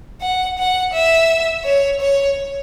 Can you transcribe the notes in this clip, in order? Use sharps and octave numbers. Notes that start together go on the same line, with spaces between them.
F#5
F#5
E5
C#5
C#5